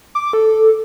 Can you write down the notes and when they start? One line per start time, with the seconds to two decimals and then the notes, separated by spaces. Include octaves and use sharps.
0.15 D6
0.33 A4